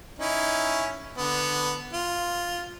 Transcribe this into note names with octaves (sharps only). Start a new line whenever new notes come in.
C#4 D#4 E4
D3 B3
F4